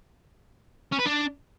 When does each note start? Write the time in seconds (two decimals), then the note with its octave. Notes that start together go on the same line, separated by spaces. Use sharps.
0.92 C#4
0.99 B4
1.06 D4